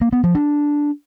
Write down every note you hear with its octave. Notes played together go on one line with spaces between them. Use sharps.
A#3
B3
F3
D4